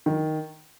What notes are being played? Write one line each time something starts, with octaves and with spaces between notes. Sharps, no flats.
D#3